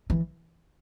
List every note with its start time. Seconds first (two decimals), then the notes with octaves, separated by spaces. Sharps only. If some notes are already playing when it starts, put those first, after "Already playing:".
0.10 E3